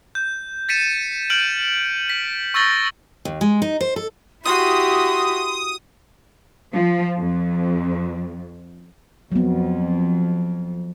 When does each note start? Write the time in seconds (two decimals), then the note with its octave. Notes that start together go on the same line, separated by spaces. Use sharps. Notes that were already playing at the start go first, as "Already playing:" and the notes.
0.15 G6
0.69 A6 B6 C#7 D#7 E7
1.30 F6 G6 D7 D#7 F#7
2.10 B6
2.54 C#6 E6 G6 A6 A#6 G7
3.25 D#2
3.41 G#3
3.62 D#4
3.81 C5
3.96 A4
4.45 E4 F#4 G4 C6 D#6
6.73 F3
7.20 F2
9.32 F2 F#3 B3